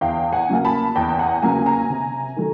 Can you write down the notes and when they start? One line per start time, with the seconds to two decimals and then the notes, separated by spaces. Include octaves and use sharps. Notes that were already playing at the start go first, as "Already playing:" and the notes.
0.01 E2 F5 G5
0.32 F#5 G#5
0.49 C#3 F#3 A#3
0.65 A5 B5
0.95 E2 G5 A5
1.19 F#5 G#5
1.42 C#3 F#3 A#3 G#5 A#5
1.66 G#5 A#5
1.89 C3
2.36 D#3 F#3 A3